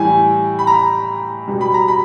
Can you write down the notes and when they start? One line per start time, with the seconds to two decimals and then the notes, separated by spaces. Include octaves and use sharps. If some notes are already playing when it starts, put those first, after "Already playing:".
Already playing: A2 E3 G3 G#5
0.59 B5
0.67 A#5
1.48 B2 G3
1.61 B5
1.74 A#5
1.88 B5